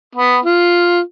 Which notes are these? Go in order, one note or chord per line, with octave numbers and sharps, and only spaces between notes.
B3
F4